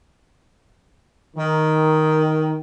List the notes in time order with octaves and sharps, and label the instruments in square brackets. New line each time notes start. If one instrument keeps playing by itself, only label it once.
[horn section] D#3